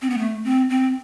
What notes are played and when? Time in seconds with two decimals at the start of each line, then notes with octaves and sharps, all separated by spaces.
0.02 C4
0.10 B3
0.18 A3
0.44 C4
0.70 C4